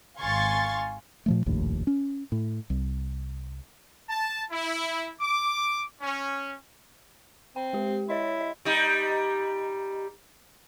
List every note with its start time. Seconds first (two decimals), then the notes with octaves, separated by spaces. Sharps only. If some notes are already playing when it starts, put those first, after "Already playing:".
0.19 G#1 F5 G#5 C6 C#6 A6
1.26 A#2 F3 A3
1.46 F1 A#1 D#2 A2
1.87 C#4
2.32 A2
2.70 C2
4.09 A5
4.51 E4
5.21 D6
6.01 C#4
7.56 C4 G5
7.73 G#3 G4
8.09 E4 C#5 D#5 C6
8.41 D#5
8.65 G3 D#4